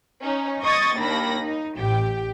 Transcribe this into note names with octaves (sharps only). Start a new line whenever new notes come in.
C#4 D#4
D#5 C#6 D#6 G#6 A6
D#2 A#3 D4 B5 A#6
D#4
A1 G4 G5